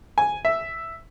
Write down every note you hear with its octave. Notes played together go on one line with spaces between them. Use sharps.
G#5
E5